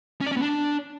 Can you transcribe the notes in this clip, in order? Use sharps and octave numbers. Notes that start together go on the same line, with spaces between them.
C#4
D5
C#4
B3
D4